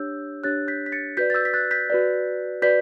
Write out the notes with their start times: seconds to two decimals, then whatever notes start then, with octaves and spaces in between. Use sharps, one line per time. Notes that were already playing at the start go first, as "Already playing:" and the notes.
Already playing: D4 G4 C#5 E6 G6
0.44 D4 G4 C#5 F#6 A6
0.68 G6 B6
0.86 B6
0.92 A6 C#7
1.17 F#4 B4 D5 G6 B6
1.30 A6
1.34 E6 G6
1.45 B6
1.54 F#6 A6
1.71 G6 B6
1.90 F#4 B4 D5
2.62 F#4 B4 D5 G6 B6